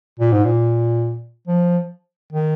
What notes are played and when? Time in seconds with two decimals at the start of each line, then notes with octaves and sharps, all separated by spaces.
0.20 A#2
0.32 G#2
0.45 A#2
1.47 F3
2.33 D#3